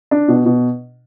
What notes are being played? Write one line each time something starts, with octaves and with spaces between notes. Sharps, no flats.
D4
B2
B2